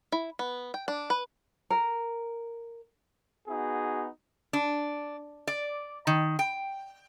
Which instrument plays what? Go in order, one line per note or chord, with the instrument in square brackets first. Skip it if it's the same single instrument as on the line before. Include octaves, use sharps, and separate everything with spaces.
[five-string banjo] E4
B3
G5
D4
B4
[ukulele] A#4
[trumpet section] B3 D#4 F#4 G#4
[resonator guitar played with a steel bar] D4
D5
D#3
G5